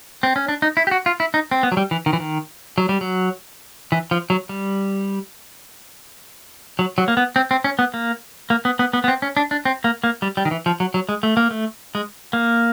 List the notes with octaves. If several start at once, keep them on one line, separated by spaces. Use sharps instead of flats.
C4
C#4
D4
D#4
E4
G4
F#4
F4
E4
D#4
C4
B3
F#3
G3
E3
D#3
E3
D#3
F#3
G3
F#3
E3
F3
F#3
G3
F#3
F#3
A#3
B3
C4
C4
C#4
B3
A#3
A#3
B3
B3
B3
B3
C4
C#4
D4
D4
C4
A#3
A#3
G3
G3
D#3
E3
F3
F#3
F#3
G#3
A3
A#3
A3
G#3
A#3